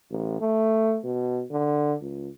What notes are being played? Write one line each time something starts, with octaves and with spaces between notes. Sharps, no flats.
A1
A3
B2
D3
C#2